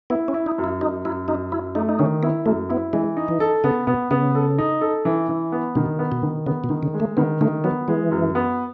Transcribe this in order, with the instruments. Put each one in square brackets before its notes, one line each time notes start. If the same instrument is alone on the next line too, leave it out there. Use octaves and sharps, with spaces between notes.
[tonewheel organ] B3 [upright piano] E4
[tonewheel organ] C#4
[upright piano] E4
[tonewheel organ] D#4
[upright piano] F#2
[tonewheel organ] E4
[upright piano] F#2 [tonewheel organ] D#4
[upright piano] F#2 [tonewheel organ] E4
[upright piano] F#2 [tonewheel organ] D#4
[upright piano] F#2 [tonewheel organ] E4
[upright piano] A3 [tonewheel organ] D#4
[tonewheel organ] D#4
[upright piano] D#3 [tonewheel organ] C#4
[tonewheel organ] B3 [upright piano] E4
[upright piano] F#2 [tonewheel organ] A3
[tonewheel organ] B3 [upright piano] E4
[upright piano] E3 [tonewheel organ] G#3
[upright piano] D#4
[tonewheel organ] E3
[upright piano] A4
[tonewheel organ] C#3 [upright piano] B3
[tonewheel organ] B2 [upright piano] B3
[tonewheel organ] C#3 [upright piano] B3
[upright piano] A4
D#4
A4
E3
E3
B3
[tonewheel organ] B2 [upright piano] D#3
[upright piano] B3
[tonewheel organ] B2
[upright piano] D#3
[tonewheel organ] C#3 [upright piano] B3
[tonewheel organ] B2
[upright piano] D#3
[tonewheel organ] C#3
[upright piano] G#3
[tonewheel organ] A3
[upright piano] D#3 [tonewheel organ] B3
[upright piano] D#3 [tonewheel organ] A3
[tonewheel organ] F#3 [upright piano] B3
[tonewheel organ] E3 [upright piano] G#3
[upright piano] F#2
B3